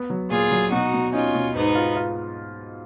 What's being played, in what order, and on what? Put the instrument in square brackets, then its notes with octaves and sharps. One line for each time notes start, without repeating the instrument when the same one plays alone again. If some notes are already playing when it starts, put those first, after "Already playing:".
Already playing: [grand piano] B3
F#3
[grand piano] A#2 [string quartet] F4 G#4
[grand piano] F#3
[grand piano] B2 [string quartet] D#4 F#4
[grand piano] B2
[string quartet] C#4 F4 [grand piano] D#4
[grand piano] B2
[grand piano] G#2 [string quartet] B3 D#4
[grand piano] F4
F4